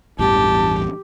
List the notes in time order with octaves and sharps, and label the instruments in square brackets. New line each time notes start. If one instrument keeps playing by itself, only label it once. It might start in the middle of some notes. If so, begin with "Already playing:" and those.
[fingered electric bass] A1 E2 G2 [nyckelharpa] G4 [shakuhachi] A5